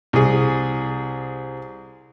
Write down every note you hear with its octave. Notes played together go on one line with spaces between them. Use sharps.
C2 G#4